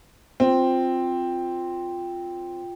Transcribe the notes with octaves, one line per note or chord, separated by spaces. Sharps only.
C4 F4 G5